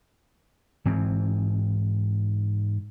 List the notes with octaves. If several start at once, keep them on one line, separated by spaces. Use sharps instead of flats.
G#2 E3 C4